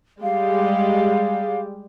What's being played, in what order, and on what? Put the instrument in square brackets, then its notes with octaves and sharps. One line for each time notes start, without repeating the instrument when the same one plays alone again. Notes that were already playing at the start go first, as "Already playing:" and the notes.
[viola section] G3 G#3 G4 [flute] F5